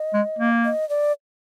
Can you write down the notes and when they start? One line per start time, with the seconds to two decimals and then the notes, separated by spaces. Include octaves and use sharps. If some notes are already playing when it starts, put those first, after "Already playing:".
Already playing: D#5
0.14 G#3
0.39 A#3
0.65 D#5
0.89 D5